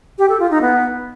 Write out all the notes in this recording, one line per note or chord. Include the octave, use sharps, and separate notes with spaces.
G4
A4
F4
D#4
B3